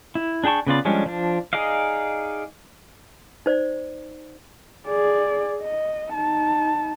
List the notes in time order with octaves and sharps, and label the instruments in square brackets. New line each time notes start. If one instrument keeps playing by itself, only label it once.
[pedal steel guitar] E4
D4 G#4 G5 A5 C#6
C#3 B3 F4 D5
F3 G3 G#3 C#4 D4
F3 D4
D#4 G#4 D5 D#5 F5
[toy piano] D#4 C5 D5
[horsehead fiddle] G#4 D5
D#5
D#4 A5